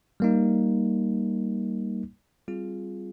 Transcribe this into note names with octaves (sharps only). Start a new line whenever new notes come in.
G3 A#3 D#4
G3 C4 F4 G#4